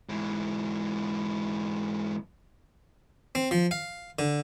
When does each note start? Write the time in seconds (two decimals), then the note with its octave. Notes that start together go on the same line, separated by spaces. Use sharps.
0.09 G#2 E3
3.35 C4
3.51 F3
3.71 F5
4.19 D3